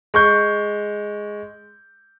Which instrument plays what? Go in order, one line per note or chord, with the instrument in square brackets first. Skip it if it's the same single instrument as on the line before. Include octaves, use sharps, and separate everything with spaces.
[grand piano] G#3 C#6 G6